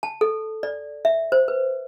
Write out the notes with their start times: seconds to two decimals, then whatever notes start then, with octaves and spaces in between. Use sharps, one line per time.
0.03 A5
0.21 A4
0.63 D5
1.05 E5
1.32 C5
1.48 B4